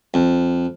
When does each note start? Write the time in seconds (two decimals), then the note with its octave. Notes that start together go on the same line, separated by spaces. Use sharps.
0.14 F2